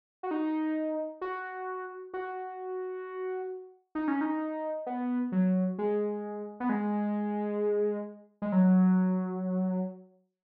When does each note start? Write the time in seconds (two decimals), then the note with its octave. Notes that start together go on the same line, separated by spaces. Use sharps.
0.23 F#4
0.31 D#4
1.21 F#4
2.14 F#4
3.95 D#4
4.08 C#4
4.21 D#4
4.86 B3
5.32 F#3
5.78 G#3
6.60 B3
6.69 G#3
8.42 G#3
8.52 F#3